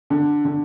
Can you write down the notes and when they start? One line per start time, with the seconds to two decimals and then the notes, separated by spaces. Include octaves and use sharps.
0.10 D3
0.45 D3